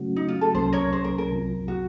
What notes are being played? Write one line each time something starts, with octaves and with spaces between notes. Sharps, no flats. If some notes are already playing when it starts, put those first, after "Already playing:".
Already playing: C#3 F#3 A3 C#4 F#4
D#4
F4
A4
C2 C3 F#3 A#3 C#4 C5
A#4 C#5
C5
A#4
A#4
C2 C3 F#3 C4 F4
F#4